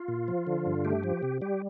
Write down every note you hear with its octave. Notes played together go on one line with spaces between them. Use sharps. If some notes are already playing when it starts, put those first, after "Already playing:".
Already playing: F4
A#2
F3
D3
G2
A3 G4
F3
C3
G3 G4